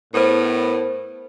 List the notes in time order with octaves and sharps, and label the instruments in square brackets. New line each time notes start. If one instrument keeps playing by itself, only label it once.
[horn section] A2 B3 [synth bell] A#4 C5